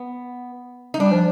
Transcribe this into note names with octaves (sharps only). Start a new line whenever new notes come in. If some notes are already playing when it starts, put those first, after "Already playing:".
Already playing: B3
D#4
G3 D4
F3